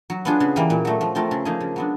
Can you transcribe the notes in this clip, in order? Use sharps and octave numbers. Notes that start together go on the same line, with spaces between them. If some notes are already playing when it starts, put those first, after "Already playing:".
F#3
B3 D4 F4 G#4
C#3
E3 G3 A#3
A#2
F#3 A3
F3
A3 C4 F4 A#4
C#3
F3 A#3 D#4 G#4
C#3
F#3 B3 D4